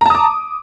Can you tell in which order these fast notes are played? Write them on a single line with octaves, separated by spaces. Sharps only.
A#5 A5 D#6 D6